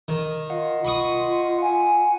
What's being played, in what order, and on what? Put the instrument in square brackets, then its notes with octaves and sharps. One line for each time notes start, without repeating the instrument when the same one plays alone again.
[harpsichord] D#3
[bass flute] F4 [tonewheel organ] D#5 F5 F#5
[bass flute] F4 [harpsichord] B5 C#6 D#6
[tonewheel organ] F#5 [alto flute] G#5